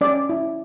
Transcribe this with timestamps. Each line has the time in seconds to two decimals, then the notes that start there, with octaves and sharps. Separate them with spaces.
0.01 C#4 D5
0.29 E4